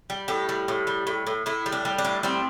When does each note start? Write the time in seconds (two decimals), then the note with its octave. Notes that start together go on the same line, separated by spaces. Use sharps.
0.10 G3
0.28 A2 G4
0.49 G3
0.68 A2
0.87 G3
1.07 A2
1.27 A2
1.46 A2 E4
1.66 G3
1.72 D4
1.85 G3
1.98 D4
2.05 A2
2.23 G3 C4